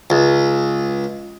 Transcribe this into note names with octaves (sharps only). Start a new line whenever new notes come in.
C#2